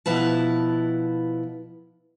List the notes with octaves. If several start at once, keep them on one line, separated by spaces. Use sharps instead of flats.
B2 F3 E4 B4 A5